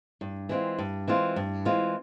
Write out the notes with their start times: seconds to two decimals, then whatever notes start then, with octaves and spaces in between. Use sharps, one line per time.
0.21 G2
0.49 E3 G#3 C4 F4
0.78 G2
1.08 E3 G#3 C4 F4
1.36 G2
1.65 E3 G#3 C4 F4